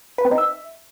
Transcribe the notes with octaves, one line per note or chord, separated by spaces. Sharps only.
B4
C4
D#4
E5